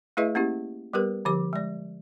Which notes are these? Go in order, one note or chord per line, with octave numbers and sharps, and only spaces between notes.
A3 E4 G#4 B4 D#5 E5
A#3 C#4 E4 G4
G3 B3 G4 A#4 B4
D3 F3 G4 D6
G#3 D5